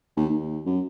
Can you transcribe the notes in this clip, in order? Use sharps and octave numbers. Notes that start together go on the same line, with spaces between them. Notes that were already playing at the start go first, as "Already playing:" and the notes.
D#2
D#2
F#2